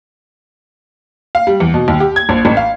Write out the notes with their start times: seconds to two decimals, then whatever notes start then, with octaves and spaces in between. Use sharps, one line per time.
1.35 F5
1.47 G3
1.60 E2
1.74 B2
1.88 D#2
2.00 G4
2.16 G#6
2.29 A#1
2.45 A1
2.57 F5